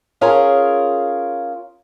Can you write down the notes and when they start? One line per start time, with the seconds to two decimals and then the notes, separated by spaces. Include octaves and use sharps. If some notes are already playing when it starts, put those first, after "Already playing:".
0.21 C#4 F4 G#4 A#4 C#5